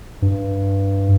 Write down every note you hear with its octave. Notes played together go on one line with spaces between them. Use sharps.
G2